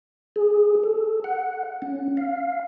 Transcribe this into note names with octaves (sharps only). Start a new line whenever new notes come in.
G#4
A4
F#5
C#4
F5